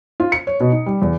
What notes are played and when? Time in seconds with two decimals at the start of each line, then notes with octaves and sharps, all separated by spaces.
0.20 F4
0.32 C#7
0.47 C#5
0.60 B2
0.72 D#4
0.86 G3
1.02 E2